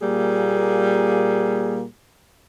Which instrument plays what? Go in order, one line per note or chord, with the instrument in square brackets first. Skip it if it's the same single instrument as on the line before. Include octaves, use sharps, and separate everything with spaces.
[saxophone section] A#2 G3 A#3 G#4